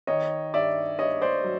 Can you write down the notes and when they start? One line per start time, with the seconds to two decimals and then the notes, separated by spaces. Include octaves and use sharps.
0.07 D#3 C#5 D#5
0.53 G2 D5 E5
0.99 G2 C#5 D#5
1.21 C5 D5
1.44 F#3